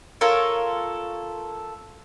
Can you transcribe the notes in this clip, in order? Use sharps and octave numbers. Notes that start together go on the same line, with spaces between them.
F4 A4 A#4 C#5